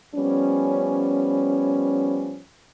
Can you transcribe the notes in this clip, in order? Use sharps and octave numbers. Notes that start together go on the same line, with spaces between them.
F3 G3 B3 C#4